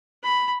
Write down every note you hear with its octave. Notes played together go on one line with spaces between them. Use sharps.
B5